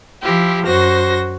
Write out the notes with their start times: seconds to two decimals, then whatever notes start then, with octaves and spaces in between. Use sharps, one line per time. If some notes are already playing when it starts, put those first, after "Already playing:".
0.23 F3 E4 G4
0.66 F#2 F#4 C5 A#6